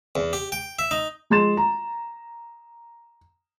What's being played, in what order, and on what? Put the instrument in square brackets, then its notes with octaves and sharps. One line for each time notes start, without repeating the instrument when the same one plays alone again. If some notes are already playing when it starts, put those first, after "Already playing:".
[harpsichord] E2
G4
G5
E5
D#4
[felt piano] F3 G#3 C6 A6 E7
A#5